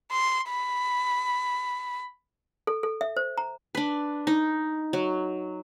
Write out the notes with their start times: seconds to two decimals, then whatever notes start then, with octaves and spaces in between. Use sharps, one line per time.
0.11 C6
0.49 B5
2.67 A4
2.83 A4
3.01 E5
3.17 C5
3.38 A#5
3.75 D4 B4
4.27 D#4
4.93 F#3